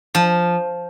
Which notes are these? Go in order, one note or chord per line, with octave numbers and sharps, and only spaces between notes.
F3